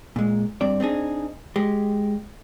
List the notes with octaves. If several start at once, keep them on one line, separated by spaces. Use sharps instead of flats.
A#2 G#3
G2 C4 D5
C4 D4 D#4 G#4
G#3 G4